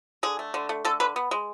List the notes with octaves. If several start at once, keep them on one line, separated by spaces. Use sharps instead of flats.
D3 G#4
A3
D3
A3
D3 A4
D3 B4
B3
G#3